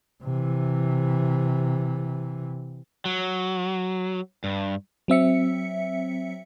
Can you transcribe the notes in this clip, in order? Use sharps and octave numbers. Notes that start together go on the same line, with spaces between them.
C3 E3
F#3
G2
F#3 C4 E5 C#7